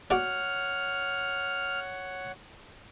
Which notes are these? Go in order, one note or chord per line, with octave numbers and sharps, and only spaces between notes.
F#4 C#5 D5 F#5 F6